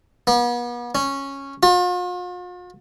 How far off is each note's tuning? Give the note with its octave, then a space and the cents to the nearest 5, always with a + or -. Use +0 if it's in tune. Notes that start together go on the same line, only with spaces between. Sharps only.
B3 -40
C#4 -10
F4 +45